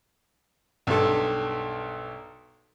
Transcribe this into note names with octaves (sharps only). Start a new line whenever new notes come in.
B1 G2 A4